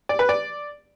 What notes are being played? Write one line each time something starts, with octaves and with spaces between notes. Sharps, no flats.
D5
B4
D5